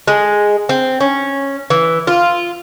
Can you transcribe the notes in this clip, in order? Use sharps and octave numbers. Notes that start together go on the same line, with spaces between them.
G#3
C4
C#4
E3
F4